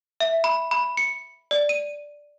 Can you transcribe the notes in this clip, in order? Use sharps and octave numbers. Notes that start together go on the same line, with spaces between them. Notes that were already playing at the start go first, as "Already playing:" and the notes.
E5
B5
B5
C#7
D5
D#7